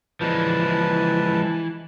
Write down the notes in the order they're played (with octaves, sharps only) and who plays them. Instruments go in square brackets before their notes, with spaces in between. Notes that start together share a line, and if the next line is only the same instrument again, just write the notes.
[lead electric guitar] E3 [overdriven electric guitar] F3 G#3 [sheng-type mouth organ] B4 A5